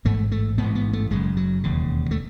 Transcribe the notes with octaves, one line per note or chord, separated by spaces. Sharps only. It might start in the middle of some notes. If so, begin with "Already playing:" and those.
A1 G#2 A3
A3
A1 G#2 B3
B3
A3
F#1 F#2 C#3 G#3
F#3
E1 D#2 C#3
A3